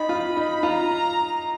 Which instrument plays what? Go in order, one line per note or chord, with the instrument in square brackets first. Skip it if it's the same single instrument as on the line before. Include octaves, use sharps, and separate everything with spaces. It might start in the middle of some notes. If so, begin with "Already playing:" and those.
Already playing: [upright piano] D#4 [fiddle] B5
[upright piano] F4
D#4
[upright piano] F4 [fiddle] A#5